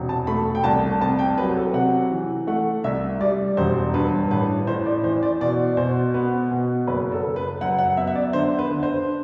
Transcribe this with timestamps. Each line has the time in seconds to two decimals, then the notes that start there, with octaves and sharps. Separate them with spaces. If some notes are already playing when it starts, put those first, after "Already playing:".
Already playing: E1 C3
0.09 A5
0.27 A3 B5
0.55 G5
0.64 C2 A5
1.01 C3 A5
1.19 G5
1.37 F#3 B4
1.55 A4
1.74 C3 F#5
2.11 E3
2.47 A3 F#5
2.84 C2 E5
3.21 G3 D5
3.57 E1 C5
3.94 G2 B4
4.31 A1 B4
4.67 A2 C5
4.86 D5
5.04 E3 C5
5.23 D5
5.40 B2 D5
5.77 B2 C5
6.14 B3 B4
6.51 B2
6.87 F#1 B4
7.12 A4
7.24 F#1
7.36 B4
7.61 F#2 F#5
7.79 F#5
7.97 B3 E5
8.07 E5
8.15 D5
8.33 D3 C5
8.59 B4
8.71 D3
8.83 C5